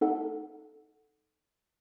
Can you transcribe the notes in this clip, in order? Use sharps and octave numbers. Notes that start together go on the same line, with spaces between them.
D#4 A4 F#5